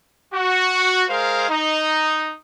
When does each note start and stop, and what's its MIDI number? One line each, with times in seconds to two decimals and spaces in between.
0.34 1.04 66
1.09 1.47 56
1.09 1.47 68
1.09 1.47 70
1.09 1.47 72
1.09 1.47 77
1.49 2.33 63